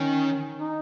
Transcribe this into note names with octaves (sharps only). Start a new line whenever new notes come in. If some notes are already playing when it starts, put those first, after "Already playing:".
Already playing: D#3 C#4
D#4